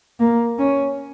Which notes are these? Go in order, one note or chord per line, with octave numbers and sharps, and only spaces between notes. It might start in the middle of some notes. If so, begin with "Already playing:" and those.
A#3
C#4